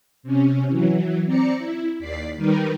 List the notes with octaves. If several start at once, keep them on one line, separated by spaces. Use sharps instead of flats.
C3 C#4
E3 F#3
C4 D5 A#5 C#7
E4
D#2 D5 B6 C7
D#3 G3 D#4 A#4 B4